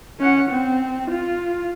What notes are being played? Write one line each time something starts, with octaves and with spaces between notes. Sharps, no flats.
C#4 F#5
C4
F4